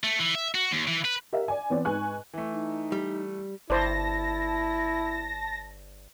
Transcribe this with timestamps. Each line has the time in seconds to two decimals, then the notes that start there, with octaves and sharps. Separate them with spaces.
0.04 A3
0.19 E3
0.35 E5
0.55 F#4
0.71 D#2
0.88 E3
1.05 B4
1.33 G4 A#4 E5 F5
1.48 D5 G#5
1.70 E3 B3 C4 C#5 D5
1.85 G#2 B4 G#5 C#6 F#6
2.34 E3 A3
2.52 D#4
2.92 G3
3.70 G1 E4 C5 D5 A5 A#6